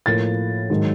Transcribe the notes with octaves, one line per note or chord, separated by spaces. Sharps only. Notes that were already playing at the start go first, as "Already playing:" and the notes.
A2 F3 A#3 A6
G#2 D#3 F#3